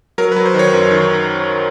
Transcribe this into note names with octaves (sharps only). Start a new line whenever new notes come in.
F#3 A#4
B4
F#3
C5
D#3 C#5
F#2
D#3